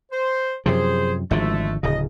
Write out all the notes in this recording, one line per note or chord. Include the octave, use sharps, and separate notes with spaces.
C5
F#2 C3 F3 G#4 C5
G#1 D3 F3 G#3 A3
D1 C#3 D#5